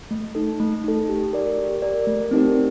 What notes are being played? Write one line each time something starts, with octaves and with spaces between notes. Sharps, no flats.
A3
D#4 A4
A3
D#4 A4
G4
A#4 D5
G4
A#4 D5
A3
C4 D#4 G4 A#4